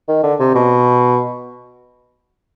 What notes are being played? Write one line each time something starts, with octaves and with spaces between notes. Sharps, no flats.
D#3
D3
C3
B2